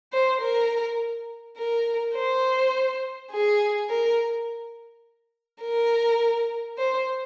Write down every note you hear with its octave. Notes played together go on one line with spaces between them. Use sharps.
C5
A#4
A#4
C5
G#4
A#4
A#4
C5